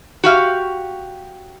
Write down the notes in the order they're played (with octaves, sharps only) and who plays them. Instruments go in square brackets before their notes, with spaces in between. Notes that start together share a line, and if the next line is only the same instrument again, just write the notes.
[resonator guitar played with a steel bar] F#4 G4 F5